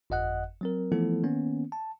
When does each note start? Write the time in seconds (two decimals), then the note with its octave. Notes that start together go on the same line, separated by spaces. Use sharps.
0.10 G1 F2 D#5 F#5 F#6
0.61 F#3 C4 A#4
0.92 E3 F3 A3 B3 E4 A4
1.23 D#3 A#3 B3 C#4
1.72 A5